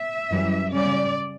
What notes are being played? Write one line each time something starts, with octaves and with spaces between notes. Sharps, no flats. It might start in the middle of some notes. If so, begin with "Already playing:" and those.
Already playing: E5
F#2 E3 G3
C#3 G3 C#4 D5